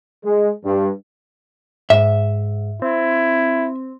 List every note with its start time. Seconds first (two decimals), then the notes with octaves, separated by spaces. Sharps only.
0.25 G#3
0.65 G2
1.90 G#2 E5
2.82 C4 E4